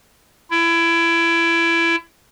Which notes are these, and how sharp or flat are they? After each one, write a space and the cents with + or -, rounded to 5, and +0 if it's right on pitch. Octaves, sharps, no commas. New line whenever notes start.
E4 +25